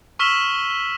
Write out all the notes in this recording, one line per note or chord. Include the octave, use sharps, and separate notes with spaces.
C#6 E6 F6 B6 E7 G7